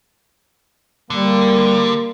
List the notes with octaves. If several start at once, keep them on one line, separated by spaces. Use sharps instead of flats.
D3 G3 A#3